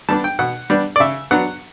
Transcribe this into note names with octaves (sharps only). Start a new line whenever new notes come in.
G3 B3 D4 A5
G5
B2 F#5
G3 B3 D4
D5
C#3 E5
F#3 B3 D4 F#5